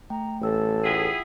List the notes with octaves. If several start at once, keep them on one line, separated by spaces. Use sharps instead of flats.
A3 G5 A#5
A1 A3 A4 E6
E4 F4 G#4 F#5 G5